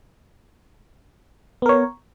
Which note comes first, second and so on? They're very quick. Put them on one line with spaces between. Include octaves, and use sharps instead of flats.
B3 A#4 C#5